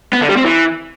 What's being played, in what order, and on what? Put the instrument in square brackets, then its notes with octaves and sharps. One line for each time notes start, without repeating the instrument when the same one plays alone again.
[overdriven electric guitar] B3
D3
G3
C4
E3